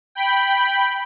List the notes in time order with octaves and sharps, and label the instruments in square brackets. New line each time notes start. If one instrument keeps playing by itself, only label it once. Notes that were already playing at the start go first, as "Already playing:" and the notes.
[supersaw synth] G5 B5